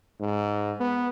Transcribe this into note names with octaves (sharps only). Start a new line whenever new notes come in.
G#2
B3